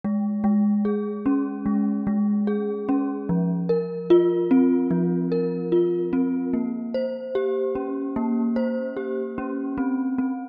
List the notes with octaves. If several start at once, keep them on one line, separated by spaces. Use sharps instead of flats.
G#3
G#3
G#4
C#4
G#3
G#3
G#4
C#4
F3
A#4
F4
C4
F3
A#4
F4
C4
A#3
C5
G4
C#4
A#3
C5
G4
C#4
C4
C4